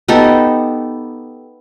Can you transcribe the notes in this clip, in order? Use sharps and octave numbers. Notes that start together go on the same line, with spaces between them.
B3 D#4 G4 A4